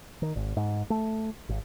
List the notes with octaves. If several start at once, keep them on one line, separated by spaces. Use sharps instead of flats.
D#3
G#1
G#2
A3
G#1